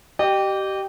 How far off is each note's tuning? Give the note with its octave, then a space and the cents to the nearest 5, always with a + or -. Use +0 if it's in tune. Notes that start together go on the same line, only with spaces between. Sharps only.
G4 -25 D#5 -30 G5 +0